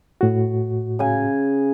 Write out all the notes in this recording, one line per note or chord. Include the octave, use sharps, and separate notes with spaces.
A2 F#4
C#3 G#5